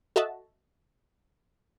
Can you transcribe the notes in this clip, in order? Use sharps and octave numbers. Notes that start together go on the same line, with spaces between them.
F#4 A4 D#5 E5 A5